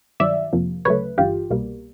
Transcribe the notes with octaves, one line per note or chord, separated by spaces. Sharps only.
G2 D#3 F#3 D5 E5
F2 C3 F3 A#3
D2 C#3 F#3 A3 B4 C#5
G1 G2 E3 F4 G4
C2 B2 G3 A#3